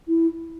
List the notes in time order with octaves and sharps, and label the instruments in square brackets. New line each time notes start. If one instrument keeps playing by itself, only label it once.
[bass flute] E4